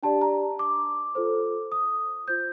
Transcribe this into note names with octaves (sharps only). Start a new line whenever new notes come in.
D4 G4 D5 A5
A#5
D6
F4 A4 C5
D#6
F4 C5 G6